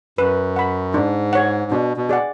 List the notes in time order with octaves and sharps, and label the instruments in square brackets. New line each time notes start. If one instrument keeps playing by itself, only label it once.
[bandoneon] F#2 [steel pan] B4
[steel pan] F#5 B5
[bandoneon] G#2 [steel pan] D4
[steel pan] G#4 C#5 F#5
[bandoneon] B2 [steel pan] D4
[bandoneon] B2
[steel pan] G#4 D5 F#5